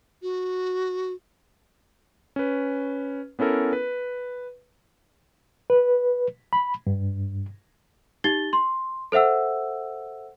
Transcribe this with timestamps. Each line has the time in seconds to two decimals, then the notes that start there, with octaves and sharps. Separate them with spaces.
0.22 F#4
2.36 C#4 B4
3.39 B3 C#4 E4 A4 A#4
3.73 B4
5.70 B4
6.53 B5
6.87 G2
8.24 D#4 G4 A6 G7
8.53 C6
9.12 A4 C5 E5 F#5 E6